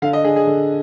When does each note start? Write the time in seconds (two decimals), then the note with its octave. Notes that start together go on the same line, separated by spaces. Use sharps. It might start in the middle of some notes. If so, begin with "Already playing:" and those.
0.02 D3 F5
0.13 D#5
0.24 D4 G#4
0.36 G#4
0.47 D3